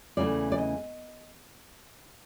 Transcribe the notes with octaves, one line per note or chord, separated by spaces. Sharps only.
E2 C#3 E3 A3 D5
D5
D#5